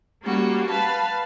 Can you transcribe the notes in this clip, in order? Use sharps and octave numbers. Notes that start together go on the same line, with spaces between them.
G3 A#3 C#4 F#4
B4 F5 A5 B5